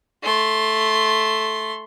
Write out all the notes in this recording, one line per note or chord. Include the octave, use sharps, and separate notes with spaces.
A3 C6